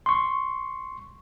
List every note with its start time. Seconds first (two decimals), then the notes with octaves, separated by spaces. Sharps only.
0.06 C6 C#6